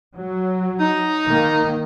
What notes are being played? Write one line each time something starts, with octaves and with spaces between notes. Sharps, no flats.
F#3
D#4
D#3 A#3